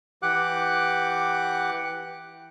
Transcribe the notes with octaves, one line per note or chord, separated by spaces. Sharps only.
E3 G4 F#5 D6 F#6